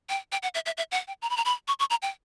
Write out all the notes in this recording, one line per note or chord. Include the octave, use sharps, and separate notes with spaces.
G5
G5
F#5
E5
E5
E5
F#5
G5
A#5
B5
A#5
B5
C#6
C#6
A#5
G5